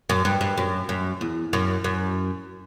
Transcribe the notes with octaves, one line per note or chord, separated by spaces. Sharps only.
F#2
G2
G2
F#2
F#2
E2
F#2
F#2